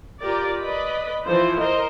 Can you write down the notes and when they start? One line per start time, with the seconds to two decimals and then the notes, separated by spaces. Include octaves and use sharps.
0.20 F4 G4 A#4 D5
0.60 B4 D5 D#5 B5
1.25 E3 F3 C5
1.58 A#4 C5 D#5